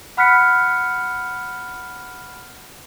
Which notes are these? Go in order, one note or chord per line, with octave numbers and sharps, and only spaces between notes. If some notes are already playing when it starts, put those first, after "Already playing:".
F#5 B5 F6 F#6 B6 C#7